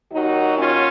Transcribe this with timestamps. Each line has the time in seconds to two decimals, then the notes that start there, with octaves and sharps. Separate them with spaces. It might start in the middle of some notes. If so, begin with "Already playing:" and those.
0.12 D#2 D#3 F#3 D#4 F#4
0.58 C#4 F4